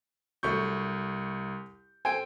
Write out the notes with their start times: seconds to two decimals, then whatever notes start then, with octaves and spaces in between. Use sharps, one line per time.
0.43 C2 F#3 A3 C#6 G6
2.05 A4 C5 G5 G#5 D7